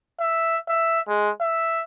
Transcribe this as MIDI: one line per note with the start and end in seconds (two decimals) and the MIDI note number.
0.20 0.58 76
0.68 1.00 76
1.08 1.30 56
1.41 1.83 76